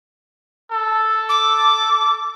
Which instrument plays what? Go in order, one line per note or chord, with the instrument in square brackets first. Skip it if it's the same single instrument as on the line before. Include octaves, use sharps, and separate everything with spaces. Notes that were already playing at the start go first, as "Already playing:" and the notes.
[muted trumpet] A4
[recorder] D6